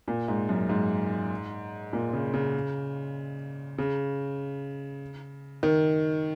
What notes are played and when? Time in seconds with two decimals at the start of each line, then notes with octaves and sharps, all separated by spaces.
0.08 A#2
0.28 G#2
0.49 F#2
0.69 G#2
1.93 A#2
2.13 C#3
2.34 C#3
3.78 C#3
5.63 D#3